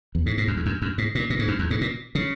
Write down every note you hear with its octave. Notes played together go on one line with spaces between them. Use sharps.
E2
G#2
G#2
F#2
E2
F#2
F#2
G#2
A#2
A#2
G#2
F#2
E2
G#2
A#2
C#3